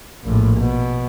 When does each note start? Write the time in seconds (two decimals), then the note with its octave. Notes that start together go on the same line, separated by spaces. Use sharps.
0.24 A#1 A2
0.60 B2